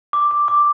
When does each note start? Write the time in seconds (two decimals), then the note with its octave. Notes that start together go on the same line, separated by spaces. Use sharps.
0.13 D6
0.31 D6
0.48 D6